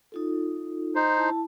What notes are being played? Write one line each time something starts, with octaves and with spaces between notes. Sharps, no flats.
D#4 F4 A4
D#4 C5
E4 A5